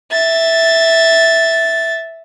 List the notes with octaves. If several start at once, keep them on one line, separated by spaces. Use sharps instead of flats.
E5 A6